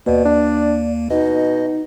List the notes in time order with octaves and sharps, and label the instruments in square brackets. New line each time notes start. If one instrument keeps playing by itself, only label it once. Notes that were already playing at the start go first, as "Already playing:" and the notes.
[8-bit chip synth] D#2 A#3 [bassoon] B2 [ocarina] D5
[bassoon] D4
[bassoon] B2 [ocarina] D#4 [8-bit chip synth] D#5